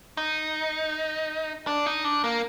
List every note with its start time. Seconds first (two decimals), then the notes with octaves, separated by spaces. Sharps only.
0.17 D#4
1.67 D4
1.86 D#4
2.05 D4
2.24 A#3